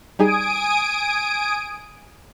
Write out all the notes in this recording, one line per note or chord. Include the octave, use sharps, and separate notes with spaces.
G3 D#4 G#4 G#5 D#6 D7